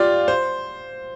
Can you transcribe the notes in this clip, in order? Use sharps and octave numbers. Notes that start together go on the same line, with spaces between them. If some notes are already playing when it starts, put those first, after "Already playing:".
Already playing: F4 G4 D5
C5